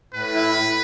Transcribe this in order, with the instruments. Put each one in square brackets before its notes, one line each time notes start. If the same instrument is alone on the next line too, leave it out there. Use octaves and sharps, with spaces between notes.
[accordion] A2 [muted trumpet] B4
[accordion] E4